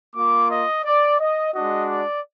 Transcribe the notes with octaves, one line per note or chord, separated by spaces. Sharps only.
A#3 F4 D6
D#5
D5
D#5
G#3 D4 F#4 D#5
D5